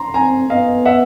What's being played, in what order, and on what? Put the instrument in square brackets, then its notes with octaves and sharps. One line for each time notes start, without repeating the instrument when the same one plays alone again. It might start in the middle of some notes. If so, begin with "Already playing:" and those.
Already playing: [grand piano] A#5 C6
[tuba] C4 [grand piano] G#5 A#5
[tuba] B3 [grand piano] D#5 F5
[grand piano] E5 F#5